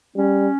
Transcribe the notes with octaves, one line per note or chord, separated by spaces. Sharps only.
G3 C#4